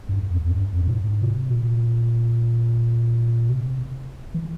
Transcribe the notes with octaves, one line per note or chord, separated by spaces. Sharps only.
G2
G2
F2
F2
G2
F2
A#2
G#2
C3
A#2
C3
E3